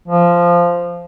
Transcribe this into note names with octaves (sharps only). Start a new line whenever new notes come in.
F3